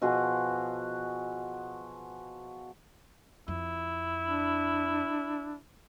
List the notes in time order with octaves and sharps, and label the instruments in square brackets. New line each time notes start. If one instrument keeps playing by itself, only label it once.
[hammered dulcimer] B2 F3 F#4 G#4
[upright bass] F2 [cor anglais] E4
[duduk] D4